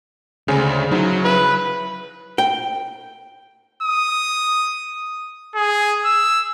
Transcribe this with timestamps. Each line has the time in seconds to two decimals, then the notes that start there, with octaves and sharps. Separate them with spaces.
0.48 D2 C#3 G#3 C4 C#4
0.91 F#3 D#4 E4 C5
1.25 E4 B4
2.38 G5
3.83 D#6
5.56 G#4
6.05 E6